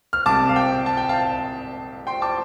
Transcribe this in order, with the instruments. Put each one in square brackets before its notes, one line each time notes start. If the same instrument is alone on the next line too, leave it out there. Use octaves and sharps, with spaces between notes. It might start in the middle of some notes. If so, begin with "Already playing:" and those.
[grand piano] F6
C2 C3 A5 D6
F5
G5
A5
G5
F5 A5
G5 C6
A5 D6